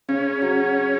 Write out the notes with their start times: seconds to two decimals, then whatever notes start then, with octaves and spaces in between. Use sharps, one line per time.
0.08 C#3 C#4
0.42 F#3